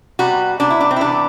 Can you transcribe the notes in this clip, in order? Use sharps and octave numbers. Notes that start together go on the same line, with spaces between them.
C3 G3 B3 F#4
C3 G3 B3 D4
E4
D4
C4
E4
C3 E3 G3 B3 D4